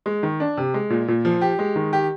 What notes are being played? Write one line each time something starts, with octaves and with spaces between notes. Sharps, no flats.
G#3
D#3
D4
C3
G#3
A#2
A#2
F3
G4
G#3
D#3
G4